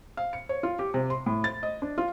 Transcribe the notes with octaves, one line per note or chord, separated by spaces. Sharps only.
F5
C#7
C#5
F4
G4
C3
C6
A2
A6
D#5
D4
F4